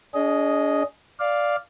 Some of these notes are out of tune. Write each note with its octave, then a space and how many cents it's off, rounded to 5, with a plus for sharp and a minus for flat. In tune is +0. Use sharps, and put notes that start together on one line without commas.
D4 -40 G#4 +5 D#5 +0
D5 +0 F5 +0